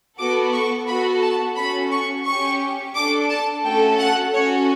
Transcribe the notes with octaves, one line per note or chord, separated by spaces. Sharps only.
B3 F#4 A4 D6
C#6
B3 F#4 A4 B5
A5
C#4 F#4 A4 B5
C#6
C#4 G4 C#6
D4 A4 D6
A5
A3 C#4 F#4 A4 G5
F#5
C#4 F#4 A4 C#5